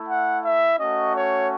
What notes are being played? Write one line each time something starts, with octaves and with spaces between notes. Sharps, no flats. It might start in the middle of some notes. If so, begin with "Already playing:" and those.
Already playing: A3 E4
F#5
E5
A3 C#4 F#4 D#5
C#5